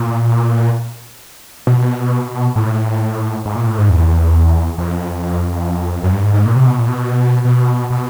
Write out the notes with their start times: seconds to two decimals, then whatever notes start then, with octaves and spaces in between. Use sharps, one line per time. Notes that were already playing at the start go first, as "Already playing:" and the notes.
Already playing: A#2
1.67 B2
2.56 A2
3.45 G#2
3.55 A#2
3.67 A2
3.78 G#2
3.90 E2
4.78 F2
6.03 F#2
6.12 G2
6.23 G#2
6.34 G#2
6.45 A#2
6.56 C3
6.66 B2
6.78 A#2
6.88 B2
7.45 B2
7.90 B2